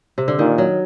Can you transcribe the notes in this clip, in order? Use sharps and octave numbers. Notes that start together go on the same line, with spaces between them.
C3
D3
A#2 D#3
F#3